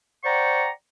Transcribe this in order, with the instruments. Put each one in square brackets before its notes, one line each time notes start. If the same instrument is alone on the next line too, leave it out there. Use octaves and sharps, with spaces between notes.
[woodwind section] C5 D5 F#5 G5 A#5 C#6